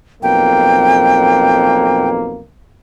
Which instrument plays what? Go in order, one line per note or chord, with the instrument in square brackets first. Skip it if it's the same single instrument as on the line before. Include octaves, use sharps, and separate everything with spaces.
[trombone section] B1 F2 A#3 [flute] G5